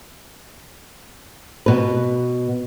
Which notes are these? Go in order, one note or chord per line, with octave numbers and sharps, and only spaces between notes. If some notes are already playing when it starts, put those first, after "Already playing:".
B2 B4